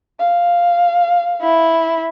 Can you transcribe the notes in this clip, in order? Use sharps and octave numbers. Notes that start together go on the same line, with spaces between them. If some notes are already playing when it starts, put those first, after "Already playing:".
F5
E4